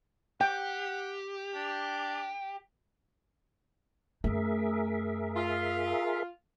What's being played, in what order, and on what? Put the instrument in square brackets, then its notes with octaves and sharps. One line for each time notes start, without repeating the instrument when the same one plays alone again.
[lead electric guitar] G4 [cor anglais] F#5 [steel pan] G5
[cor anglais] D4
[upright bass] F#2 A3 [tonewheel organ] G#4 A#4 E5
[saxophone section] F4